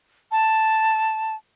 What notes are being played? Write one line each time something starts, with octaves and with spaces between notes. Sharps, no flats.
A5